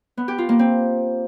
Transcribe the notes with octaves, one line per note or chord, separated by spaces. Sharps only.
B3
G4
F4
A#3
C4